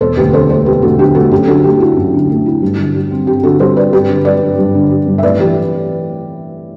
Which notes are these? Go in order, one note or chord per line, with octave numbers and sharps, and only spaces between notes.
E1 A4 C5
D2 G4 B4
D3 A4 C5
A3 A4 C5
E1 G4 B4
D2 F#4 A4
D3 G4
A3 F#4 A4
F#2 G4
D3 F#4 A4
A3 G4
E4 F#4
F#2
D3
A3
E4
G2
D3
G3
C4
G2 G4
D3 F#4 A4
G3 A4 C5
C4 B4 D5
G2 G4 B4
D3
G3 B4 D5
G2
G2
D3
G3
G2
E5
A2 B4 D5
E3 G4 B4